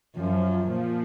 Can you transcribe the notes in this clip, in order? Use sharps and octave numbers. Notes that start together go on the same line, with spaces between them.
F#2 F3
A#2 F3